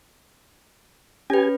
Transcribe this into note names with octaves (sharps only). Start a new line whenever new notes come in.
C#4 G4 B4 G#5